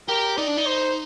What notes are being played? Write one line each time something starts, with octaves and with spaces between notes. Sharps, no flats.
G4 A#4
D#4 D5
D4
D#4
C5